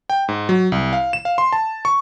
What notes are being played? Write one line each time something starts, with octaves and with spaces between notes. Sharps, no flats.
G5
G#2
F#3
C2
F5
E7
F5
C6
A5
C#6